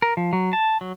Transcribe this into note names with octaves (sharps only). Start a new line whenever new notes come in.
A#4
F3
F#3
A5
F#3